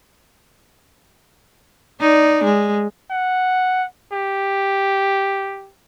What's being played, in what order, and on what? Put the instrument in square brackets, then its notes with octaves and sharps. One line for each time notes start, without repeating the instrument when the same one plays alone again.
[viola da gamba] D#4 D5
G#3
[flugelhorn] F#5
G4